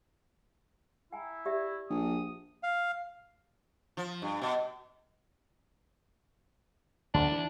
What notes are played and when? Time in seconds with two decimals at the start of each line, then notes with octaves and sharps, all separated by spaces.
1.13 E4 G5 G#5 A#5
1.46 G4 D5 E5
1.90 A#1 D#6
2.63 F5
3.97 F3
4.22 G2
4.42 B2
7.14 D2 D4
7.32 E3